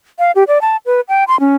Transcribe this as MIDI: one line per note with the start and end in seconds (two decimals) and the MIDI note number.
0.19 0.32 77
0.35 0.44 67
0.48 0.61 74
0.61 0.77 81
0.86 1.01 71
1.09 1.24 79
1.28 1.39 84
1.40 1.56 61